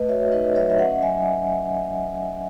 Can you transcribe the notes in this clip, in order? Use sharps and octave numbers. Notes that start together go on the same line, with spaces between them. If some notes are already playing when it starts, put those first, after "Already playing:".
Already playing: A3 B4 D#5
F#4 C#5 E5
D#4 B4 D#5
F#3 C#5 E5
E5
C#4 D#5 F#5
F#3 E5 G#5